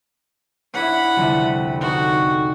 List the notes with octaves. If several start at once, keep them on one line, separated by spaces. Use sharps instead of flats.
C#4 D4 E4 F#5 B5
C2 F2 D3
D#4 F#4 A4